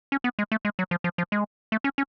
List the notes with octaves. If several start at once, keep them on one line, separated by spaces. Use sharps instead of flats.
C#4
B3
G#3
A3
G#3
F#3
F3
F3
F3
G#3
A3
C#4
C#4